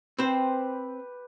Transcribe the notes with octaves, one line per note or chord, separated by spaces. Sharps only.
C4 G4 B4 C5